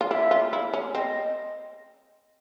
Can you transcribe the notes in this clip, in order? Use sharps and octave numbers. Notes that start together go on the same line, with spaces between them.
F4
E4 E5
F4
E4
C#4
C4 D#5